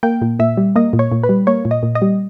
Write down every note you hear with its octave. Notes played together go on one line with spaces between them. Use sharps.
A#3 G5
A#2
A#2 E5
G3
A#3 D#5
A#2
C#5
A#2
B4
G3
A#3 C#5
A#2
D#5
A#2
D#5
G3